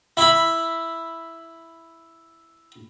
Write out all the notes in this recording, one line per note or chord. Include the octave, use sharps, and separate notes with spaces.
E4 B5